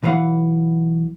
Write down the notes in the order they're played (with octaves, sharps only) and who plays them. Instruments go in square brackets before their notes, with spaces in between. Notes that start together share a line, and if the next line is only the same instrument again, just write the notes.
[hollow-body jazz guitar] B1 E3 B4 F5 F#5